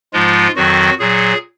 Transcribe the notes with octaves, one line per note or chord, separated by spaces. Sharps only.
G#2 F3 G#3 F4
F2 D#3 F#3 F#4
A#2 F#3 G#4